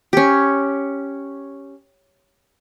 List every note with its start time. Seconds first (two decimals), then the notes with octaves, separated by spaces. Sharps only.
0.13 C#4 G4